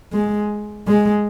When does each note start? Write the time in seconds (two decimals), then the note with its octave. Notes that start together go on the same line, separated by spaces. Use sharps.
0.13 G#3
0.88 G#3